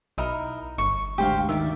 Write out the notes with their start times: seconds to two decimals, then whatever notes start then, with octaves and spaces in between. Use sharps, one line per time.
0.18 B1 D#4 E4 A#4
0.78 G1 C#6
1.18 D2 G#2 D3 G4 C5 F5
1.49 D#3 D5 E5